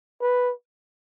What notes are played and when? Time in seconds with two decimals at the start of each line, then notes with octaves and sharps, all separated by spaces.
0.21 B4